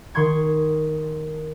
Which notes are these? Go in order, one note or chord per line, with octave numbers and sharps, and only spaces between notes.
D#3 C6 C#6 G#6 C#7